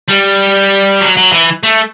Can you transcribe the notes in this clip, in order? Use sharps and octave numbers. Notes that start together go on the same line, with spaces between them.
G3
F#3
F#3
E3
A3